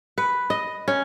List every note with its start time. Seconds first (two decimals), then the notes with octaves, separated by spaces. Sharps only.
0.18 B4
0.50 D#5
0.88 C#4